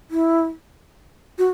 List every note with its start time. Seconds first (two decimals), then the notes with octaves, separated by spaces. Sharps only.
0.11 E4
1.38 F#4